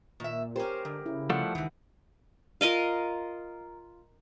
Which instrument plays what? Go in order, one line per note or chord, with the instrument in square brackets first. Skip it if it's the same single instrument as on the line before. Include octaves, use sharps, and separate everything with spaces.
[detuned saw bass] A#2 [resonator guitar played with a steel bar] D#3 E5
[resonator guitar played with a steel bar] C#4 C5 [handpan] G4 A#4
[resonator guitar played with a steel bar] G#2 [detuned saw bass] D3
[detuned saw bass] C#3 [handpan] E4
[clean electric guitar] F3 G3 A3 [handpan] F#5
[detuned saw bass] C#2 [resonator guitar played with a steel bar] G#2 E3 [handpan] D#3
[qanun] F4 A#4 D#5 F5